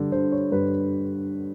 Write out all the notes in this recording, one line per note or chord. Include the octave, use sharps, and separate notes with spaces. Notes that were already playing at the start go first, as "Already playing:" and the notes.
Already playing: G2 D3
D3 C5
C#5
G2 B4